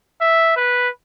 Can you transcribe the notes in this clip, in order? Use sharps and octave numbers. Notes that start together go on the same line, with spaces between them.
E5
B4